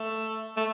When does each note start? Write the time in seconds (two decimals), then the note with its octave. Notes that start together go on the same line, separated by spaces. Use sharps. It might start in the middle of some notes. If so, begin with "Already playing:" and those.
Already playing: A3
0.57 A3